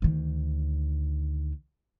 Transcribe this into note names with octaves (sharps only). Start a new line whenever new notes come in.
D2 D#3